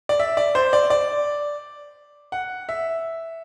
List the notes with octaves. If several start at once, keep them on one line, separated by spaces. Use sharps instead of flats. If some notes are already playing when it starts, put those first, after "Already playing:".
D5
E5
D5
C5
D5
D5
F#5
E5